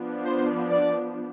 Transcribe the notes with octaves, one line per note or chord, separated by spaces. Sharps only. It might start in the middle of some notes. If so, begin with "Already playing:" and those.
Already playing: F3 B3 D4
C5
D5